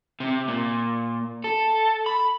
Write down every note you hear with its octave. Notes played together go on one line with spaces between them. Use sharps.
C3
A#2
A4
B5